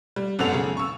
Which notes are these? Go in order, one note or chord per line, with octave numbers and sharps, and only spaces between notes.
G3
G#1 F#2 B3 A4 F7
C#3 G#4
C#6 E6